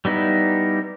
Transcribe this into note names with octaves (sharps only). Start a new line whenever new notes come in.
G3 B3 D#4 E4